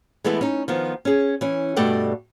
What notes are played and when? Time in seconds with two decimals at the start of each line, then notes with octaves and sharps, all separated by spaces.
0.24 E3 G#3 A3 B3 E4 B4
0.41 C#4 D#4
0.68 D#3 F3 B3
1.05 C#4 G#4
1.41 E3 C#4
1.76 G2 B2 A3 D5 F#5 G5